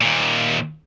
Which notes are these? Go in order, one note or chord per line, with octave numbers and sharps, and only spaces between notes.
D#2 A#2